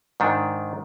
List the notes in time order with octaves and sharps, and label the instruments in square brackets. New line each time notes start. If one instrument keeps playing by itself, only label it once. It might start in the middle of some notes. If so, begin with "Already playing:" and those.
[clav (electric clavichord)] G#2 D#3 D4